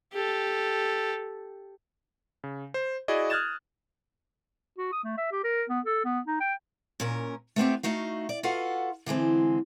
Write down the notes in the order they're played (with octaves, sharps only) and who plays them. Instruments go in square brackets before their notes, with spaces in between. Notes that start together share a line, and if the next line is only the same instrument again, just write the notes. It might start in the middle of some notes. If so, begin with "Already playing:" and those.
[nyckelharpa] G4 A4
[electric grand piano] C#3
C5
E4 F#4 G#4 D5 D#5
D#6 F6 F#6 G#6 A6 E7
[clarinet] F#4
D#6
A3
E5
G4
A#4
B3
A4
B3
D#4
G5
[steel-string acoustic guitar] A#2 C#4 A#4
A3 B3 C4 G4
A3 D#4 F#4 F5
D5
F4 F#4 A4 B4 F5 F#5
D3 E3 G#3 C4